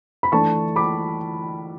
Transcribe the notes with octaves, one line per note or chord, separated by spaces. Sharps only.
B5
E3 A3 D4 A5 C#6
B5 D6